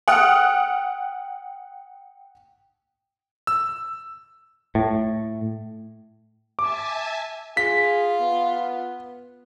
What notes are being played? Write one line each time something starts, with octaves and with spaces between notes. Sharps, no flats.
F#5 G5 D#6 F6 F#6
E6
A2
E5 G#5 A5 D6
F4 G#4 B6
B3